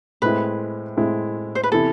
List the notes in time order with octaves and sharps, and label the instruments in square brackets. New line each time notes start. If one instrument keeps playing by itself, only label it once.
[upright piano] A2 G#3 C4 E4 [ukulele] B4
[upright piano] A2 G#3 C4 E4
[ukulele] C5
B4
[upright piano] C3 E3 B3 E4 [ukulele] A4